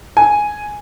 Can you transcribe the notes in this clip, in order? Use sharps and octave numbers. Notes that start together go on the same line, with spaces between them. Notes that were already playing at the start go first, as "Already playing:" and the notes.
G#5